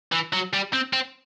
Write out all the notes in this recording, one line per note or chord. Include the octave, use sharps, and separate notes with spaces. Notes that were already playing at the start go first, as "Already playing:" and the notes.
E3
F#3
G3
C4
C4